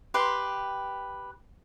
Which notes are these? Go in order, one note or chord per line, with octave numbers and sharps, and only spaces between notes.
G4 B4 C6